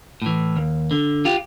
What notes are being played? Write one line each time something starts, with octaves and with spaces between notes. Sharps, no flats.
A2 E3
D#2
D3
F4 G4